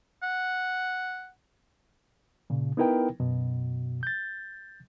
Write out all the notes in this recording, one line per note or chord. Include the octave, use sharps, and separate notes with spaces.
F#5
A#2 C#3
B3 D#4 E4 A#4 B4 G5
F#2 B2
G6 A6